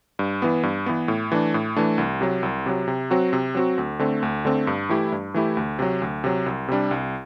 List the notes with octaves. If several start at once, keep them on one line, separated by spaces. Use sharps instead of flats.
G2
E3 B3
G2
E3 B3
A2
E3 A3 D4
A2
E3 A3 D4
C2
C3 F#3
C2
C3 F#3
C3
F#3 C4 F#4
C3
F#3 C4 F#4
D2
D3 A3 C4
D2
D3 A3 C4
G2
E3 A3 E4 G4
G2
E3 A3 E4 G4
D2
C3 F#3
D2
C3 F#3
C2
C3 G3 D4
C2